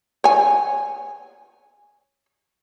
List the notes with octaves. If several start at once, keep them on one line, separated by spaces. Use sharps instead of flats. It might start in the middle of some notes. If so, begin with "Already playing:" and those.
C#5 G#5